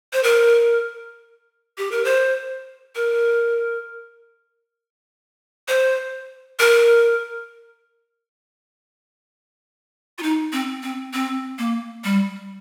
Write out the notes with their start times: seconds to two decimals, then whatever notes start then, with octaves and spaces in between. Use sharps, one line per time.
0.13 C5
0.23 A#4
1.78 G4
1.92 A#4
2.05 C5
2.95 A#4
5.68 C5
6.59 A#4
10.18 F4
10.23 D#4
10.53 C4
10.83 C4
11.13 C4
11.59 A#3
12.04 G3